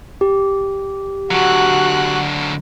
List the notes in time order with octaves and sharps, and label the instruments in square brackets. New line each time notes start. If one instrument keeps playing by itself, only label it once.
[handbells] G4
[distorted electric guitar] D3 F#3 [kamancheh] F#4 F#6